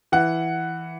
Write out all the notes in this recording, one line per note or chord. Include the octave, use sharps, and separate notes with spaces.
E3 F#5